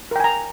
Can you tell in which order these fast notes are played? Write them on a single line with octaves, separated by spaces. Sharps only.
A#4 G5 G#5 A#5